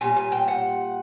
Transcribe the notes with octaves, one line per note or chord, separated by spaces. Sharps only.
A#2 G3 G#5
G#5
G5
F#5